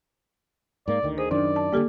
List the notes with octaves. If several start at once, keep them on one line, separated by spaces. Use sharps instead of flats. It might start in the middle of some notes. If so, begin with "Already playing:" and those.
G#2 A#3 D5
D2 D3 D#3
G#4 C5
F#2 D#3 D4 D5
A5
D3 F#3 G3 A#3 G4 A4